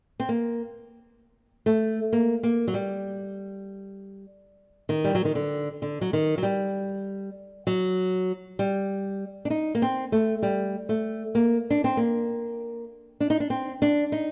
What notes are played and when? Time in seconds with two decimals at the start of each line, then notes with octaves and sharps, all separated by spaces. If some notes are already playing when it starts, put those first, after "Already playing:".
0.20 C4
0.29 A#3
1.66 A3
2.13 A#3
2.43 A#3
2.68 F#3
2.74 G3
4.89 D#3
5.04 G3
5.15 F#3
5.25 D#3
5.35 D3
5.82 D3
6.01 F#3
6.13 D#3
6.38 F#3
6.43 G3
7.67 F#3
8.59 G3
9.45 D4
9.50 D#4
9.75 A#3
9.82 C4
10.12 A3
10.42 G3
10.89 A3
11.35 A#3
11.70 D4
11.84 C4
11.97 A#3
13.20 D4
13.30 D#4
13.40 D4
13.50 C4
13.82 D4
14.12 D#4